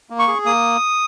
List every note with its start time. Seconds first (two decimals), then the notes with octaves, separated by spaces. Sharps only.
0.10 A#3
0.19 C#6
0.28 G#4
0.45 A#3 D#6